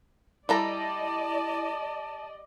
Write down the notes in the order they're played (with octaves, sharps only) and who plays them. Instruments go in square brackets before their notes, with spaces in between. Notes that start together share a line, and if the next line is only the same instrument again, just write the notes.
[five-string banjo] G3 A4 A#5 [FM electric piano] E4 A#6 [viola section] D5 D#5 [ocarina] A5